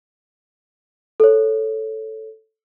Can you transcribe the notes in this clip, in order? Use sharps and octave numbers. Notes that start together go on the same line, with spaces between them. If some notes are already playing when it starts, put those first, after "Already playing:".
A4 C#5